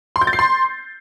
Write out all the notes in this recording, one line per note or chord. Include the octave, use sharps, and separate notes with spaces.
C6
G6
A6
C7
C6